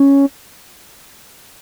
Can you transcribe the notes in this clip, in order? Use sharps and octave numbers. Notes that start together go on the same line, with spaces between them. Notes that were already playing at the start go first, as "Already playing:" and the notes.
Already playing: C#4